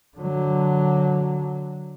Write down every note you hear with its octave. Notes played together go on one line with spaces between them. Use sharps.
D3 F#3